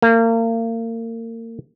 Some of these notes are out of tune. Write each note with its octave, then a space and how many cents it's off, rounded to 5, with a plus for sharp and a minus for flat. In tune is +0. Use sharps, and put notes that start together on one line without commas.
A#3 -35